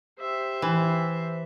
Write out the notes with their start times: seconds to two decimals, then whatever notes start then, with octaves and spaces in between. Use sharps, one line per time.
0.20 G4 C5 E5
0.62 E3